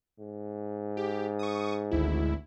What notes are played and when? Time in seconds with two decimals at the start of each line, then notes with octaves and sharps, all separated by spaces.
0.19 G#2
0.97 G4
1.39 C#6 D#6
1.91 G#1 D2 E4